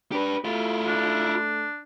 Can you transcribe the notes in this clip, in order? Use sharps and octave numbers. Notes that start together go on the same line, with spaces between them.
D4 G4 B4
A3 E4 F4
D4